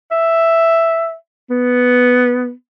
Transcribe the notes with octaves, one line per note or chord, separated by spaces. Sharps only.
E5
B3